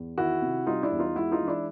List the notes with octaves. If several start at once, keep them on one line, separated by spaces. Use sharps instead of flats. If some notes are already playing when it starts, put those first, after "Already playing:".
Already playing: E2
D#3 E4 F#4
C3
G3 D#4 F4
D4 E4
E2
D#4 F4
G#3 E4 F#4
D#4 F4
E3
D4 E4